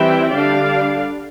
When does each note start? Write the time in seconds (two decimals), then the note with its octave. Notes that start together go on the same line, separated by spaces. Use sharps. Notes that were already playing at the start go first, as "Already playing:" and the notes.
Already playing: E3 G3 C4 E4 E5 G5
0.33 D3 G3 D4 D5 F5